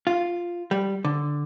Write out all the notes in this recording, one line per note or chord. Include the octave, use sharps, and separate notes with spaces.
F4
G3
D3